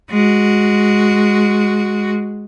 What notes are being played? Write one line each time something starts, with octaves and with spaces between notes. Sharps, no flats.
G#3 F#4